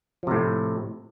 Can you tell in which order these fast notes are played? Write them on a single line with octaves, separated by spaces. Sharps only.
F3 C3 A2